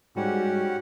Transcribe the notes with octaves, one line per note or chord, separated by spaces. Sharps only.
G#2 G3 C#4 F#4 G4 F#5